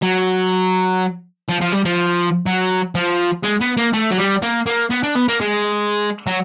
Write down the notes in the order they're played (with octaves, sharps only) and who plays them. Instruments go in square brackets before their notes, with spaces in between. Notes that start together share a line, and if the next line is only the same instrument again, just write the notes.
[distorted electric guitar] F#3
F3
F3
G3
F3
F#3
F3
G#3
B3
A#3
A3
F#3
G3
A#3
A#3
B3
D4
B3
A#3
G#3
F#3